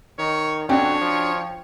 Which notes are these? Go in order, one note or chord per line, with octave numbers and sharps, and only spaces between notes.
D#3 C#5
F2 C#4 D4 F#4 C#5 G5
F3